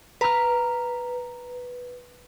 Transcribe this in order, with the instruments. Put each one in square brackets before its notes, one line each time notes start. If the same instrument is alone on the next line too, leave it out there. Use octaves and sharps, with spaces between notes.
[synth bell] B4 [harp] A#5 F6